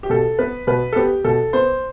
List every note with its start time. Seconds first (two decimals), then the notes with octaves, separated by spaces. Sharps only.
0.03 G4
0.10 B2 A4
0.39 B3 B4
0.67 B2 B4
0.93 A4
0.96 B3 G4
1.24 B2 A4
1.53 B3 C5